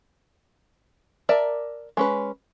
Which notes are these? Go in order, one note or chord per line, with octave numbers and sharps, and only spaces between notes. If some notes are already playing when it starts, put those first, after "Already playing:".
A#4 D5 E5 A5
G#3 C#4 B4